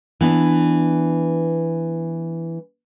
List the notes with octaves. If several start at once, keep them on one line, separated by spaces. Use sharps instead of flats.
E3 B3 D4